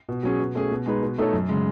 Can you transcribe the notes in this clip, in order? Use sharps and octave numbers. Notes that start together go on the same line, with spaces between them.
B2
F#3 C#4 G#4
B2
A3 C#4 G#4
B2
G#3 D#4 G#4 B4
B2
A3 D#4 A4 C#5
F#2
C#3 G#3